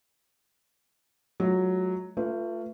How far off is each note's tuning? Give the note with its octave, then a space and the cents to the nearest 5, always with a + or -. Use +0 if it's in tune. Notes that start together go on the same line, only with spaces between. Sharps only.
F#3 +0 A3 -45 F4 +0
A3 +30 F4 +0 B4 +0